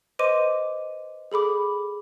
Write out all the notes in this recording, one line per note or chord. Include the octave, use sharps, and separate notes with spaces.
B4 C5 D#5 C6 D6 D#7
G#4 A4 B5 D6